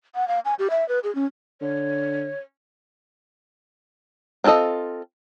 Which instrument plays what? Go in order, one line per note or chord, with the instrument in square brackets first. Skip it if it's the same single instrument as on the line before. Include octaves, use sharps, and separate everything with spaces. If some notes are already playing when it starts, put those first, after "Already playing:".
[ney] F#5
F5
G#5
G4
E5
B4
G#4
C#4
[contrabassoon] D3 [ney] C#5
[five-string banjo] C4 D4 F4 A4 D#5